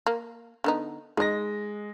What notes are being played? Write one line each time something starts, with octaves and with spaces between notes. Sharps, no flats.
A#3
D3 B3 D#4
G#3 D#4 D#5 A#6